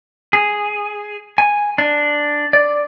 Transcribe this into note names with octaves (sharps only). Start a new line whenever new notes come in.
G#4
G#5
D4
D5